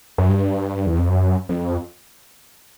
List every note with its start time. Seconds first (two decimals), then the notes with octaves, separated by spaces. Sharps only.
0.18 F#2
0.29 G2
0.86 E2
0.98 F2
1.09 F#2
1.49 F2